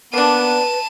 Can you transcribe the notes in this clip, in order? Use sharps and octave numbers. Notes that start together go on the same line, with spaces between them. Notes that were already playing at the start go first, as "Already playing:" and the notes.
A#3 B3 D4 B4 A5 D#7